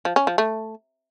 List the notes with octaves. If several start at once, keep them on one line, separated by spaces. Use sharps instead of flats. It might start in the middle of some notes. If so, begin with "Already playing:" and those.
F3
C#4
F3
A3